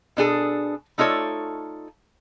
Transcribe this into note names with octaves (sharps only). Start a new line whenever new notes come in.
B2 D4 G#4 A4
A3 D#4 F4 A4 C#5 D5